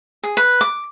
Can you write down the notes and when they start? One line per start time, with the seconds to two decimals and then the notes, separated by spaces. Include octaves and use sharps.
0.24 G#4
0.37 B4
0.61 D6